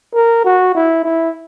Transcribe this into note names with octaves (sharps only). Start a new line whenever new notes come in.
A#4
F#4
E4
E4